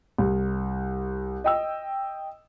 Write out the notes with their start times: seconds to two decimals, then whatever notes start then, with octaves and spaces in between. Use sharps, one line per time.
0.18 C2
1.44 D#5 G5 E6